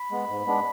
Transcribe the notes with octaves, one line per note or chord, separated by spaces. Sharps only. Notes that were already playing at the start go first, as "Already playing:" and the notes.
Already playing: B5
G#3 B3
G#2
G#3 B3 D4